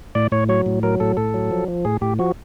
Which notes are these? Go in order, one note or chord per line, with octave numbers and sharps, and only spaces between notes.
A2 D5
A2 C#5
F#3 C#5
A2
F#3 A#4
A2 A4
A2 A4
F#3
F3
F3
A2 G#4
A2 G4
F3 F#4